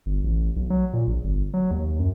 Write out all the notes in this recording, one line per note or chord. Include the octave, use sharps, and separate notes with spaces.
G1
A1
B1
F#3
A#2
A#1
G1
F#3
D#2
F#2